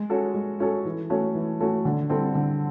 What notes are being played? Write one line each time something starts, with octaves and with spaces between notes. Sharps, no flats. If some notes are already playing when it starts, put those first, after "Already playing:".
Already playing: G#3
C#4 F#4 A4
G#3
C#4 F#4 A4
E3
A3 C#4 F#4
E3
A3 C#4 F#4
D3
G3 C4 E4 A4
D3